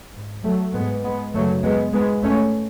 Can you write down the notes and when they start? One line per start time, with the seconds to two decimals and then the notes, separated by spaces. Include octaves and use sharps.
0.14 G#2
0.44 F#3 A3
0.74 G#2 G#3 B3
1.04 G#3 B3
1.33 F#2 C#3 F#3 A3
1.64 G#3 B3
1.93 G#2 G#3 B3
2.23 A3 C#4